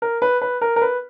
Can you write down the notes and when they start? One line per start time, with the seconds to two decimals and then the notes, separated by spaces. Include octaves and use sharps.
0.02 A#4
0.22 B4
0.41 B4
0.61 A#4
0.76 A#4
0.82 B4